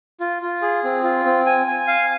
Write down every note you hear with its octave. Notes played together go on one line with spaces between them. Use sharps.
F4
F4
G#4
C4
F4
C4
G#5
G#5
F5